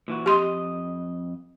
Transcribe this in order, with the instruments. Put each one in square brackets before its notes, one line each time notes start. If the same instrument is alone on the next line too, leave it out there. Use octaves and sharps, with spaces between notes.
[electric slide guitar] A#2 E3 F#4
[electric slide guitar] F2 D#5 [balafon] G4 C6